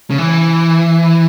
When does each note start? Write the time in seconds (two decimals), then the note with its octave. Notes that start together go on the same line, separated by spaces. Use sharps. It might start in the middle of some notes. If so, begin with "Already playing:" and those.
0.10 C#3
0.18 E3